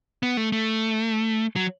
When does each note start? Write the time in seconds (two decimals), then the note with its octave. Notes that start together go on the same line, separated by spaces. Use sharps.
0.23 B3
0.37 A3
0.52 A3
1.56 F#3